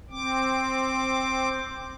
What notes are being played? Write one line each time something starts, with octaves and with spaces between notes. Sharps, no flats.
C4 D6